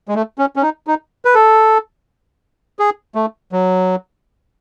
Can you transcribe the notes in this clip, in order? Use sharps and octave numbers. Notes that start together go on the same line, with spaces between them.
G#3
A3
C#4
C#4
D#4
D#4
B4
A4
G#4
A3
F#3